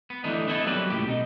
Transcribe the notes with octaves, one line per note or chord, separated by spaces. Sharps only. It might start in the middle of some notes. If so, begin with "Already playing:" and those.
B3
D3 E3 A3 D4 D#4
B3 D#4 E4 A4
F#3 G3 A#3 B4
C#2 A2 G4
B2 D#4